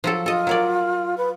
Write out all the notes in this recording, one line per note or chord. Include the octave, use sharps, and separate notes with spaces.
F3 F#3 A4
F4 A4 D#5
F#3 A#4 D5
B4